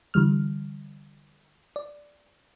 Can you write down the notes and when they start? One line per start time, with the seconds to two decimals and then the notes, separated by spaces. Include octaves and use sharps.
0.14 D3 E3 G3 F6
1.76 D5